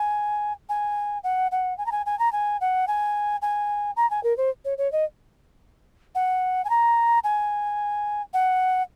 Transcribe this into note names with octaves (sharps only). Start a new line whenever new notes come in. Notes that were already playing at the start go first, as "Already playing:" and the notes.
Already playing: G#5
G#5
F#5
F#5
G#5
A#5
G#5
G#5
A#5
G#5
F#5
G#5
G#5
A#5
G#5
A#4
C5
C#5
C#5
D#5
F#5
G#5
A#5
G#5
F#5